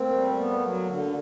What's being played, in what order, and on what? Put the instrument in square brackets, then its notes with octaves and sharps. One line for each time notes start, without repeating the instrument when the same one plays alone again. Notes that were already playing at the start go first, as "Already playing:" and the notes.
Already playing: [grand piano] A3 A#3 [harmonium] C4
[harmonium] G3
B3
F#3
D3